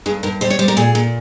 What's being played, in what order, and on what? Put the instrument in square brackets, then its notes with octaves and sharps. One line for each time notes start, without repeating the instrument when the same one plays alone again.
[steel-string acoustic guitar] G2 G#4
G2 A#4
G3 C5
C#5
G3 C5
A#4
A#2 G#4
A#2